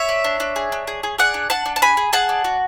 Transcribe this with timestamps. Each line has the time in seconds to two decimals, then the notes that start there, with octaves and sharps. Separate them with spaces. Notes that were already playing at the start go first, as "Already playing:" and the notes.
Already playing: C#5 E5
0.09 D4
0.24 D4
0.40 D4
0.56 G#4
0.72 D4
0.87 G#4
1.03 G#4
1.18 G#4 D5 F#5
1.34 D4
1.50 D4 F#5 A5
1.66 D4
1.76 A5
1.82 G#4 G#5 B5
1.97 G#4
2.13 G#4 F#5 A5
2.29 D4
2.44 F#4